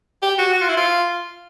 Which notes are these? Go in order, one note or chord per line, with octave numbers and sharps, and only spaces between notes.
G4
F#4
F#4
F4
E4
F4